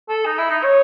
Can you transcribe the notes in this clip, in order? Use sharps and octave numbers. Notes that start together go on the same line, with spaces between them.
A4
D#4
E4
D#4
C#5